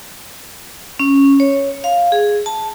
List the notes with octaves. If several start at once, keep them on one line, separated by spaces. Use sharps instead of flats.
C#4
C#5
F5
G#4
A5